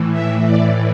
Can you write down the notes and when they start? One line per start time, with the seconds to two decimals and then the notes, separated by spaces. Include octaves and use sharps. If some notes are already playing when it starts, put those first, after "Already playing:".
Already playing: A2 E3
0.12 E5
0.45 D5